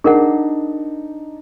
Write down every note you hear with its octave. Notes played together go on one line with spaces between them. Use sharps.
D4 D#4 G#4 A#4 F#5